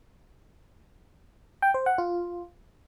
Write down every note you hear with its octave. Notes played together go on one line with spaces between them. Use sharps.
G5
C5
F#5
F4